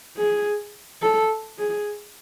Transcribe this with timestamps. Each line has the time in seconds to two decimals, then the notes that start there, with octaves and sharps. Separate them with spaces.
0.17 G#4
1.02 A4
1.59 G#4